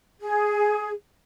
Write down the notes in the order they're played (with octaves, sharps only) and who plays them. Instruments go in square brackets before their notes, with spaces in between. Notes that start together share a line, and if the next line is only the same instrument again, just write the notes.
[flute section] G#4